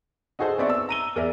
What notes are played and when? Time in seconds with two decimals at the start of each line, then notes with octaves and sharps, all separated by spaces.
0.39 D#4 F#4 G#4 A4 C5
0.58 B3 C4 D5 E5 C#6
0.70 E6
0.89 A#5 D#7 G7
1.16 E2 A#4 D5 E5